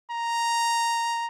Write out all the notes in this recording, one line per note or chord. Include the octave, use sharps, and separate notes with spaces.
A#5